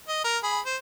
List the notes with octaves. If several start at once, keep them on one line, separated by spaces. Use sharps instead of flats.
D#5
A#4
G#4 B5
C5